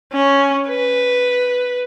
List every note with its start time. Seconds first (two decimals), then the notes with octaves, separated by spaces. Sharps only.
0.13 C#4
0.68 B4